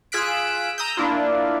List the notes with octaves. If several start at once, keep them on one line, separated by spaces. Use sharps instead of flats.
F4 G#4 E6 F#6 B6 D7
A#5 D#6 E6 G6
A#3 D4 E4 F4